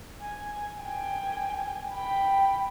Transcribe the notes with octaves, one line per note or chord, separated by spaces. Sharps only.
G#5
G5 G#5
G5 B5